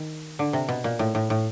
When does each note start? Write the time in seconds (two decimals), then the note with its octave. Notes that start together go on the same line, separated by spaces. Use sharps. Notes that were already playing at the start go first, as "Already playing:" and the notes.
Already playing: D#3
0.39 D3
0.53 C3
0.68 B2
0.84 A#2
0.99 A2
1.15 A2
1.30 A2